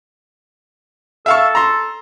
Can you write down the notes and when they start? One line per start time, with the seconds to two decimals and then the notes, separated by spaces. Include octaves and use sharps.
1.26 A4 E5 F5 C#6
1.55 A#5 C6